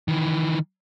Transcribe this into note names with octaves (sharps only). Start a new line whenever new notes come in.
D#3 E3